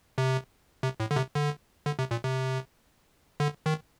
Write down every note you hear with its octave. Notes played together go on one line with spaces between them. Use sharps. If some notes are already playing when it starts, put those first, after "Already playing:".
C3
C3
A2
D3
C3
D3
D3
C3
A#2
C3
D3
D#3